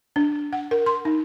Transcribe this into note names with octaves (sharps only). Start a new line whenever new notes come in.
D4
F#5
A#4
C6
D#4